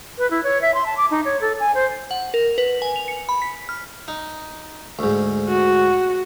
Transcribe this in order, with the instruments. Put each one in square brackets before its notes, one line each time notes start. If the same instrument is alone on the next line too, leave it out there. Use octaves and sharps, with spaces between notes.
[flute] B4
E4
C#5
E5
C6
A5
D6
D#4
C#5
A4
G#5
C5
[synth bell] F#5
A#4
B4
G#5
F7
C#7
B5
B6
F6
[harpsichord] D#4
D2 G#2
[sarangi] F#4